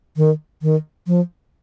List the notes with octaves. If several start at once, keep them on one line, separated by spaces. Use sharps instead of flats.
D#3
D#3
F3